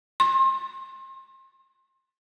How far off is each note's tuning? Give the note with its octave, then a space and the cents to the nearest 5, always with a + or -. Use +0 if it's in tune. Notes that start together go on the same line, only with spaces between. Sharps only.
C6 +35